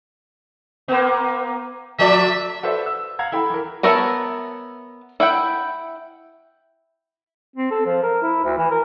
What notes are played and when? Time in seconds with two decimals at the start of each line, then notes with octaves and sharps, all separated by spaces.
0.88 A#3 B3
1.99 F3 A3 D5 E5
2.63 F#4 A4 B4 C5 D5 E5
2.86 E6
3.19 F5 F#5 A#5 G#6
3.32 E4 A4 G5 B5
3.50 E3 A#4
3.83 B3 A#4 C#5 E5 A5
5.20 E4 E5 F#5 G5
7.56 C4
7.71 A4
7.86 F3
8.03 A#4
8.22 E4
8.44 D2
8.58 E3
8.71 A#4